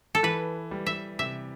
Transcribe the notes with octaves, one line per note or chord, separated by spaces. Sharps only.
A4
E3 B4
G3
E5
C3 E5